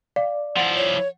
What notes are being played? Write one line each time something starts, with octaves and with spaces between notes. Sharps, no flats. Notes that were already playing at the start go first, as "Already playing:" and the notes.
D5 F5
F3 E4 F#5 A6
C#5